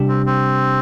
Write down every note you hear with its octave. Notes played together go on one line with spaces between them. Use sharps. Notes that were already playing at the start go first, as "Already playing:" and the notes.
Already playing: C3 G3 D4 G4
C4
C4